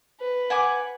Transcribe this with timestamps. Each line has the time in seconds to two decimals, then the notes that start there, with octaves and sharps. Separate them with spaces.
0.20 B4
0.50 F#5 G#5 D6